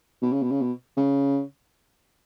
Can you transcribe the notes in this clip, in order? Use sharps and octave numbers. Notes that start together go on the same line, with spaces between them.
B2
C#3
B2
C#3
B2
C#3